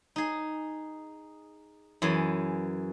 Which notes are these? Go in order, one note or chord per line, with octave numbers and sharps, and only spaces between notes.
D#4 G#4
F#2 E3 G#4